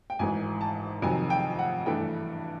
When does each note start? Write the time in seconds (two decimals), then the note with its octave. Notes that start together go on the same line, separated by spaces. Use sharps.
0.10 G5
0.19 G#1 G#2 E3 G#5
0.61 A5
1.02 F2 C3 D#3 F#3 G#5
1.30 G5
1.59 F#5
1.86 G2 E3 A3 D4 G5